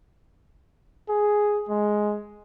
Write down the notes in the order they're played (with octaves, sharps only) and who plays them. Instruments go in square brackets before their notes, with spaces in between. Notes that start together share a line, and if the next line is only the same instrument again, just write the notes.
[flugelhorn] G#4
G#3